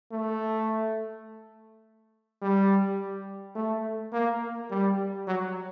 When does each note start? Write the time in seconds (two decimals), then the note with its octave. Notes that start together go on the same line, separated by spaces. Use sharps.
0.12 A3
2.42 G3
3.56 A3
4.13 A#3
4.71 G3
5.27 F#3